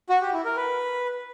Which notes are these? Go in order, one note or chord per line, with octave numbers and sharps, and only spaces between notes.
F#4
G4
E4
A#4
B4